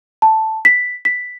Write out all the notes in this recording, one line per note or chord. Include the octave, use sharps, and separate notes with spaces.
A5
B6
B6